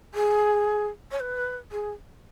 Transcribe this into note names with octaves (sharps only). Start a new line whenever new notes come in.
G#4
C#5
B4
G#4